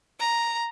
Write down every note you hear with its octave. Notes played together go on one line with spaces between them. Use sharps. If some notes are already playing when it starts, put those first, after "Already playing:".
A#5